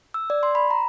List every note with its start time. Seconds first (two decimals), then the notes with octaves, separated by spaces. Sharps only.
0.14 E6
0.30 D5
0.43 C6
0.55 B5
0.71 A#5